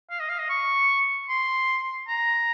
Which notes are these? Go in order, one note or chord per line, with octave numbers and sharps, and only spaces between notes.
F5
D#5
F5
D#5
C#6
C6
A#5